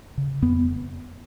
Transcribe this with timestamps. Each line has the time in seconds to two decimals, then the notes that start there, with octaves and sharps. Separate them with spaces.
0.18 C#3
0.42 F2 B3